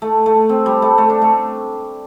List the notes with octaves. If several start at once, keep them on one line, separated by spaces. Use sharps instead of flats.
A3
A3
C4
G3
A3
A3
D4
A3